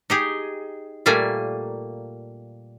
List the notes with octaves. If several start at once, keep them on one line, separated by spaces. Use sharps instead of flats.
D#4 G4 G#4
A#2 G3 A3 A#3 G#5